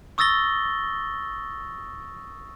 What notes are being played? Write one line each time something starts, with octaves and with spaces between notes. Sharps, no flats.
C#6 D#6 E6 A6 A#6 G7